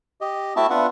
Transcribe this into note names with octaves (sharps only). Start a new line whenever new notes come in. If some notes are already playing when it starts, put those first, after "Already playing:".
G4 D#5
A3 C4 E4 F#4 E5 A5
B3 D4 F4 B4 E5 F#5